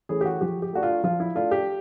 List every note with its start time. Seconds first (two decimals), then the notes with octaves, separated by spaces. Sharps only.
0.09 E3 A3 C#4 G#4
0.21 G4
0.25 F#4
0.41 F3 G4
0.62 G4
0.73 A3 D4 F#4
0.83 F4
1.04 F3 F4
1.20 E4
1.35 A3 D4 F4
1.51 G4